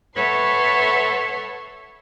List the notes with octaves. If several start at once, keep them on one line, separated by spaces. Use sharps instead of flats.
A4 B4 C#5 E5 F#5 C6